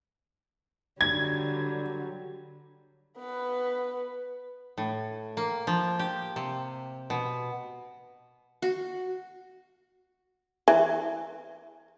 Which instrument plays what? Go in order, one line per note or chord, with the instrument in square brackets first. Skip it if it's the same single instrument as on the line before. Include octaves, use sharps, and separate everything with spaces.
[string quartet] D3 F#3 G3 [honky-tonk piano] G#6
[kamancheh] B3 B4
[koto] A2
A#3
F3
G4
C3
B2
[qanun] F#4
[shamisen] E3